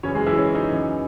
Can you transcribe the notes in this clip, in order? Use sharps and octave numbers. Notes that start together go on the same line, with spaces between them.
F#2 C#3 E3 C#4 C#5
G#3 G#4
E3 E4
C#4
D#4
F#2 C#3 E3